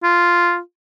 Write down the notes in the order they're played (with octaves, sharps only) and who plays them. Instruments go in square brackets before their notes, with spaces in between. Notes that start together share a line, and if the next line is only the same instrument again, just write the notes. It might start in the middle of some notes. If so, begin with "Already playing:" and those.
[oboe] F4